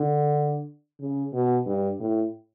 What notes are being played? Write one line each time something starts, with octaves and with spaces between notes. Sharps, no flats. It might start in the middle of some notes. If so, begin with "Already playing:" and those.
Already playing: D3
C#3
B2
G2
A2